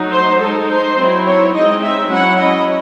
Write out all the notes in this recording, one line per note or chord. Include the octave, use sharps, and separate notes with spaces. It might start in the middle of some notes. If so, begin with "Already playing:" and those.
Already playing: F#3 A3 D#4
C5
G#3 D#4 A4
C5
F#3 C4 E4
C#5
G#3 C4 D#4 D#5
E5
F#3 C#4 E4 F#5
D#5